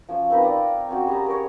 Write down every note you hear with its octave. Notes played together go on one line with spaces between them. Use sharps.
F3 C#4 E6
C4 D#4 A#4 B4
D5 F5 A#5 D#6
C4 C#4 F#4
G3 G#4 A5 A#5
A#4 C#5